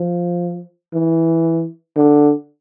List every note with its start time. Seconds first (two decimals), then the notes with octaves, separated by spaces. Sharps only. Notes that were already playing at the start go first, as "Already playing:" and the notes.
Already playing: F3
0.94 E3
1.96 D3